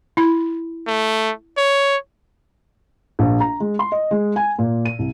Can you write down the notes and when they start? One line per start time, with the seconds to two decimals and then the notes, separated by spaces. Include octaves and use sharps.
0.17 E4 B5
0.87 A3
1.58 C#5
3.19 A#1
3.40 A#5
3.60 G#3
3.79 C6
3.92 D#5
4.11 G#3
4.36 G#5
4.59 A#2
4.85 D#7
4.99 C2